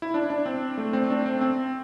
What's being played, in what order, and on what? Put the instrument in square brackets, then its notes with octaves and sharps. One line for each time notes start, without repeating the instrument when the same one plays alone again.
[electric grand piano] E4
D4
D4
C4
A3
C4
D4
C4
C4